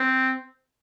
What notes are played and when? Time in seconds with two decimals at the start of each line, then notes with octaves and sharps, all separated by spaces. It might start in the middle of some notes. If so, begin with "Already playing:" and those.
Already playing: C4